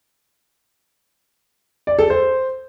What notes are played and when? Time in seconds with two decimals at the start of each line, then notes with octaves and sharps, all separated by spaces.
1.87 D5
1.99 A4
2.10 C5